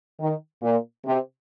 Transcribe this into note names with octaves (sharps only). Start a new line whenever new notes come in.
D#3
A#2
C3